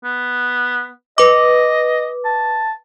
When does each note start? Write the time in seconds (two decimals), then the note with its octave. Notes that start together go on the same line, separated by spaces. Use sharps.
0.04 B3
1.18 B4 D#5 D6
2.25 A5